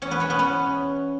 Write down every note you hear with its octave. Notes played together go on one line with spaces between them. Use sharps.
E2 C#4 C#5
B3 B4
B2 C#4 C#5
B3 B4
E2 C#4 C#5